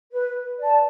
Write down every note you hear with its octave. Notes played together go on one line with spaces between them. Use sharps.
B4
D5 A5